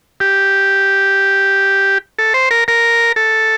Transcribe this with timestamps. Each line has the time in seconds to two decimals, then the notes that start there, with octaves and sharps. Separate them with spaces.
0.20 G4
2.19 A4
2.34 C5
2.51 A#4
2.68 A#4
3.16 A4